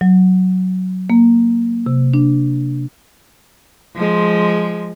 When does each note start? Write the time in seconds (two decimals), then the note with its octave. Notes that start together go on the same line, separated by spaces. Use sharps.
0.01 F#3
1.10 A#3
1.86 C3
2.14 D4
3.95 F3 G#3